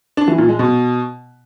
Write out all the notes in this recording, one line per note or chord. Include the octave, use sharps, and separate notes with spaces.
D4
E3
A#2
G#3
B2